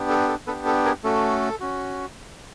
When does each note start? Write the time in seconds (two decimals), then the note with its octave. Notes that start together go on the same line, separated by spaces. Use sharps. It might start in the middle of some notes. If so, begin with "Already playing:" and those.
Already playing: B3 D4 G4
0.09 A4
0.28 A4
0.47 B3 D4 G4 A4 B4
0.66 A4
0.85 G#4 A#4
1.04 A3 C#4 F#4 A4
1.60 C#4 F#4